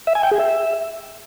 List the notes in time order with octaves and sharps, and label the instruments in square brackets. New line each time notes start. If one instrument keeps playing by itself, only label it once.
[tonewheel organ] E5
G#5
G5
G#4
E5